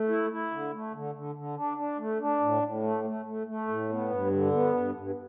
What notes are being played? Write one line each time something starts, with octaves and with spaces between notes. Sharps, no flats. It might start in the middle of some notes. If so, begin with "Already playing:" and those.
Already playing: A3
E4
E4
D3
A3
D3
D3
D3
D4
D4
A3
D4
A2
A2
A3
A3
A3
A3
A2
B3
G2
D3
B3
G2
G2